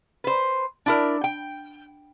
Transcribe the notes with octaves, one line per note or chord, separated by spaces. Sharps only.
B4 C5
D4 E4 A#4
G5